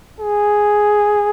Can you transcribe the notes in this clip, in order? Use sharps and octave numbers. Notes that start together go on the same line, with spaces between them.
G#4